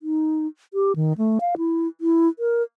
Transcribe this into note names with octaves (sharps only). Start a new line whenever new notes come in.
D#4
G4
D#3
A3
F5
E4
E4
A#4